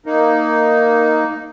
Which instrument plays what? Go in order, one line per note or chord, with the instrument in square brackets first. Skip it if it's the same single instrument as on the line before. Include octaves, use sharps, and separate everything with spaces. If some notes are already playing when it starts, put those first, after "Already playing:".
[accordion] A#3 D#4